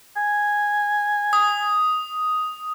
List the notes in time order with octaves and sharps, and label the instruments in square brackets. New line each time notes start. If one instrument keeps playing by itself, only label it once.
[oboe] G#5
[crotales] D#6